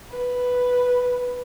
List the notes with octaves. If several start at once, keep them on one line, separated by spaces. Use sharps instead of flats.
B4